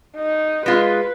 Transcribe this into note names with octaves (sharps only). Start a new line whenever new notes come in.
D#4
G#3 F4 B4